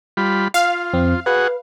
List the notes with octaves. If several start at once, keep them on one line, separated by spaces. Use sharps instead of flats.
G3 F4 B5
F4 F5
F2 C4
F#4 G#4 B4 F#5